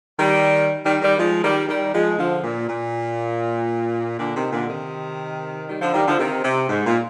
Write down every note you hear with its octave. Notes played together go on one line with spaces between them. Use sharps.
D#3 G3
D#3 G3
D#3 G3
F3 G#3
D#3 G3
D#3 G3
F3 G#3
D3 F3
A#2
A#2
A#2 D3
C3 D#3
A#2 D3
C3 D#3
D#3 G3
D3 F3
D#3 G3
D3 F3
C3 D#3
C3
G#2
A#2